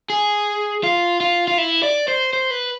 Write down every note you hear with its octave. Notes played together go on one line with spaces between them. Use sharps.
G#4
F4
F4
F4
E4
D5
C5
C5
B4